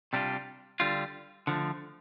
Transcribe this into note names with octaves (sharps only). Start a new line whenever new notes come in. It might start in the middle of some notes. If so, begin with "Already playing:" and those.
C3 G3 D4 F4
D3 G3 F4
D3 F3 A3